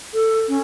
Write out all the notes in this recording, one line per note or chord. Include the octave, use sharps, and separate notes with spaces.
A4
C#4